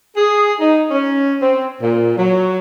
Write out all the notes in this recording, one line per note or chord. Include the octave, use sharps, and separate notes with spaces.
G#4
D#4
C#4
C4
A#2
F#3